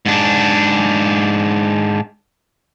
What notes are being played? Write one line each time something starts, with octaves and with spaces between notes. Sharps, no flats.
G#2 D4